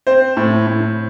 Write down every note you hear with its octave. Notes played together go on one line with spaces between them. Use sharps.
C4 C5
A2
A2